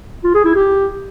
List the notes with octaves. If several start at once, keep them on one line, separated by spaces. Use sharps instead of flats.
F4
G#4
E4
G4